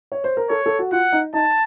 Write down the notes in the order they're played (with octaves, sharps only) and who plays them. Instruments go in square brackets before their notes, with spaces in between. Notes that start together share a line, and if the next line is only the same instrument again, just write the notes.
[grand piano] C#5
C5
A#4
[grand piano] A4 [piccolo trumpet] C#5
[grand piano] A4
F#4
[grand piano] F4 [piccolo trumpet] F#5
[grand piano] D#4
[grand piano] D#4 [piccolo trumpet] A5